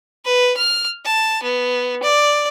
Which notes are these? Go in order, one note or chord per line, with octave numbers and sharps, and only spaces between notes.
B4
F6
A5
B3
D5